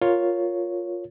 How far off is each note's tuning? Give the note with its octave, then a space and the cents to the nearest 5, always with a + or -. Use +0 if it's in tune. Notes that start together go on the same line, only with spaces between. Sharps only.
F4 +5 A#4 +0 C#5 +0